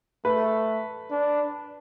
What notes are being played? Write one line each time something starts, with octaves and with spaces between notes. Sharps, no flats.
A3 B4
D4